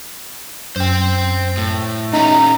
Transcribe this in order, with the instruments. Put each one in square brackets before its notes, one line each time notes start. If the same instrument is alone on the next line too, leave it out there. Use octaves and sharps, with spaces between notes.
[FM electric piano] F#2 [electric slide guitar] C5 G5
[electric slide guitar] A2
[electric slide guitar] A#2 C#4 [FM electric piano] D#4 [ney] A#5